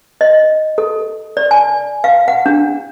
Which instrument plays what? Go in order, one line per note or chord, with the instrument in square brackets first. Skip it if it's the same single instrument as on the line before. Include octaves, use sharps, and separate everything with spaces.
[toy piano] D#5
A4
D5
G#5
F5
F#5
D4